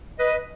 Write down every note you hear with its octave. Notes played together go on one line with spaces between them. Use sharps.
B4 D#5